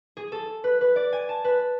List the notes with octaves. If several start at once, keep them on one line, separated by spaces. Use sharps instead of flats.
G#4
A4
B4
B4
D5
G#5
A5
B4